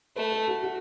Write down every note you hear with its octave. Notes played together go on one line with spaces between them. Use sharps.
A3 B4
A4
F#4
F#4